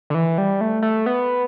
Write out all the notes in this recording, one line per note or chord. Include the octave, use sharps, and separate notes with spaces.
D3
E3
G3
A3
A3
B3